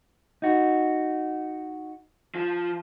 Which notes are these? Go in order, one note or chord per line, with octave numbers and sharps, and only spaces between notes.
D#4 F#4
F3